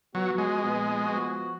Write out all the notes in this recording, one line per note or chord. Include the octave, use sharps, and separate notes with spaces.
F3 F#3 B3 F#4
G#3
A#2 F3 B3
F3 B3 F#4